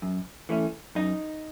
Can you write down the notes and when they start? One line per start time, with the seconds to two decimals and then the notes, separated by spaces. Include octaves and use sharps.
0.02 F#2
0.49 E3 A3 C#4
0.95 F#2 D#4